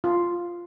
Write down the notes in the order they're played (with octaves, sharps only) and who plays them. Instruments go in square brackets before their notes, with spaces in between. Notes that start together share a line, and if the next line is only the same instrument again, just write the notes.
[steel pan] F4